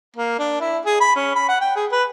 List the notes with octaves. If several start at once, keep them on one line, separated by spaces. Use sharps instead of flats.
A#3
D4
E4
G#4
B5
C#4
B5
F#5
G5
G#4
B4